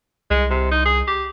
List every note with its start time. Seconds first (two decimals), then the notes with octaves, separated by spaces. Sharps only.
0.30 C2 G#3
0.50 C3
0.71 D#4
0.85 G#4
1.07 G4